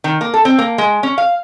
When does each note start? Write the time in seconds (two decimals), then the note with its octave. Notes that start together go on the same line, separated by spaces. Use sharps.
0.04 D#3
0.21 A#3
0.34 A4
0.45 C4
0.58 A#3
0.78 G#3
1.03 C#4
1.18 F5